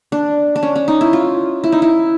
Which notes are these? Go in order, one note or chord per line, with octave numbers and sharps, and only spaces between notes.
D4
D4
C#4
C#4
D#4
E4
F4
E4
D#4
E4